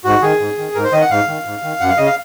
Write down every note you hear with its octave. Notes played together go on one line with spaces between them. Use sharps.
G#2 F#4
D#3 G#4
G#2
D#3
G#2 A#4
C5
D#3 D#5
F#5
G#2 F5
D#3
G#2
D#3
F#2 F#5
F5
C#3 D#5
F5